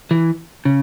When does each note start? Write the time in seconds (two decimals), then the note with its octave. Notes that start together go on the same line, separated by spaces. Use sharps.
0.11 E3
0.65 C#3